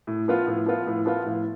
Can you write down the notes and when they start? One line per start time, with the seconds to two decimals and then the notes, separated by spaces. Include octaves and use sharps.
0.07 A2
0.28 F3 B3 F4
0.47 A2
0.66 F3 B3 F4
0.87 A2
1.06 F3 B3 F4
1.26 A2